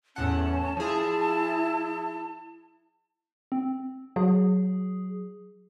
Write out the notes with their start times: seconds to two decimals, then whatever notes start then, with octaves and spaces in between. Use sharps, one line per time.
0.16 E2 A2 C#4 F#5 A5
0.77 F3 E4 G#4
3.52 C4
4.16 F#3 G#4